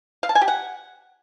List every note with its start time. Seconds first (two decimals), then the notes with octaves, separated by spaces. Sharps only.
0.23 F5
0.29 A5
0.35 G#5
0.42 G4
0.48 F#5